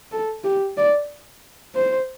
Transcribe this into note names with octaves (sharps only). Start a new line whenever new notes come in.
A4
G4
D5
C5